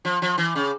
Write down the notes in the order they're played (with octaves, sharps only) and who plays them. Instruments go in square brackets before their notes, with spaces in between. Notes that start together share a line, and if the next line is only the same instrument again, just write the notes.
[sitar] F3
F3
E3
C#3